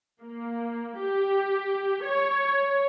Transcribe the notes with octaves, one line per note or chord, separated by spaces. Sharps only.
A#3
G4
C#5